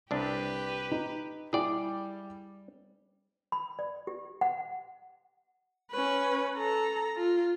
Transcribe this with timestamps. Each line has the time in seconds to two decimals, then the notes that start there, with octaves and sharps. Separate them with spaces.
0.11 C2 D4 G4 B4
0.92 D#4
1.53 G3 E4 G#4 D5 G5 D6
3.52 B5
3.79 D5
4.07 G4
4.41 F#5
5.91 C#4 B4
6.57 A4 A#5
7.17 F4